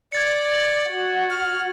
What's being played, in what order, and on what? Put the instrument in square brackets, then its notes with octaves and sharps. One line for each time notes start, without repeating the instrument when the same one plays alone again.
[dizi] D5 [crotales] G#6 A6 C#7
[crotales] F#7
[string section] F#4
[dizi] F6